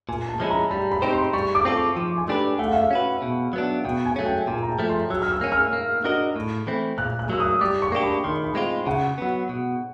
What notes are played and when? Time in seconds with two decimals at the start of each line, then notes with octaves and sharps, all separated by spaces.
0.09 A#2 G#5
0.29 A5
0.40 F3 G#3 C#4 E4
0.50 A#5
0.71 G3 B5
0.92 B5
1.02 C4 D#4 G4 C5
1.13 C6
1.33 G3 C#6
1.55 D6
1.65 C4 F4 A4
1.76 C#6
1.96 F3
2.17 G#5
2.28 A3 D4 G4 B4
2.59 A3 F#5
2.67 F5
2.74 E5
2.81 F5
2.91 C#4 F#4 B4
3.22 B2
3.53 F#3 B3 D4
3.84 B2 G5
4.06 G#5
4.16 F#3 A3 C#4
4.26 G5
4.47 A#2 G#5
4.63 A#5
4.69 A5
4.79 F3 A3
4.89 C6
5.10 F#3 E6
5.22 F6
5.32 E6
5.41 A#3 C#4
5.52 F6
5.73 A#3
6.04 D4 F#4 A#4 D#5
6.36 A2
6.67 E3 A3 C4 E4
6.98 A#2 F#6
7.19 F#6
7.30 F#3 A#3 E6
7.40 D#6
7.61 G3 D6
7.82 C#6
7.92 A#3 D4 G4
8.03 B5
8.24 D#3 C6
8.44 B5
8.55 G#3 C4 F4
8.87 C#3 F#5
9.18 F#3 B3
9.49 B2